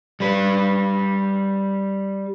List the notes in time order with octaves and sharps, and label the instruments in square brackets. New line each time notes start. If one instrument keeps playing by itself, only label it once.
[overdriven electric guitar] G3 B4